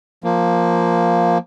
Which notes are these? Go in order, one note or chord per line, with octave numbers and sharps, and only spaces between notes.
F3 A#3